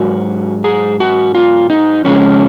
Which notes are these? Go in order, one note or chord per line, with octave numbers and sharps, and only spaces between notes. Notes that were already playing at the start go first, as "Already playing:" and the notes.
Already playing: G#2 F#3 F#4
G#4
F#4
F4
D#4
F2 C#3 G#3 C#4